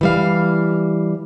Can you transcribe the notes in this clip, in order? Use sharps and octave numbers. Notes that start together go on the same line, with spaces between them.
E3 G3 F5